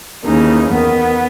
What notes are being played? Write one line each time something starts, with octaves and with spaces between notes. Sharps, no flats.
D#2 C#3 E3 D#4
E2 D#3 B3